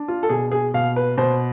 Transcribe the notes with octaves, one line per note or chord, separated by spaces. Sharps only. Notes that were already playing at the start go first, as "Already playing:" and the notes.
Already playing: D4
F4
A4
B2 G#4
G#4
B2 F5
B4
B2 C5